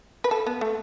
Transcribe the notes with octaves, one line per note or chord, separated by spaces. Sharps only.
B4
A4
B3
A3